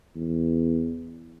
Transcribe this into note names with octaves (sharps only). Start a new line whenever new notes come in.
E2